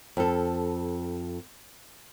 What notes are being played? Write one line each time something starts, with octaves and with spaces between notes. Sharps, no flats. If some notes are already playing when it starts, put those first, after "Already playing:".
F2 A4